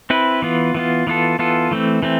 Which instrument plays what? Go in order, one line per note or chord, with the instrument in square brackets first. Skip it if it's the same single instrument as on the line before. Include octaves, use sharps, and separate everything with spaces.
[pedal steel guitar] C4 E4 B4
E3 B3 F4
E3 B3 F4
E3 B3 F4 A4
E3 B3 F4 A4
E3 A3 C4
E3 A3 C4